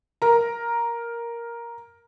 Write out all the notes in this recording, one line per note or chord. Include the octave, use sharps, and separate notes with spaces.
A#4 A#5